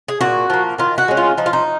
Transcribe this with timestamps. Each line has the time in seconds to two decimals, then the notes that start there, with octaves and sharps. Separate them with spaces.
0.08 G#4
0.21 A#2 F#4
0.50 F3 A#3
0.78 D#3 F4
0.98 F#4
1.08 G#3 C#4
1.17 F4
1.38 F3 D#4
1.46 F4
1.53 D#4